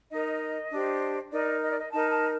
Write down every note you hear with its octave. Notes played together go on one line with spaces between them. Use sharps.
D#4 A#4 D#5
D4 G4 C5
D#4 A#4 D5
D#5
D5
D#5
D#4 A#4 A5
A5